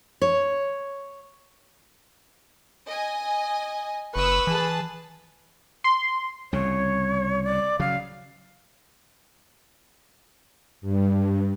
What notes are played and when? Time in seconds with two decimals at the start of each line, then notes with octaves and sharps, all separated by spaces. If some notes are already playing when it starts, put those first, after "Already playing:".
0.22 C#5
2.86 D#5 G#5
4.16 F#1 B4 C#6 D#6 E6
4.47 E3 G#4 A5
5.84 C6
6.53 C2 C#3 C#5
7.44 D5
7.79 C#3 F#3 F5
10.81 G2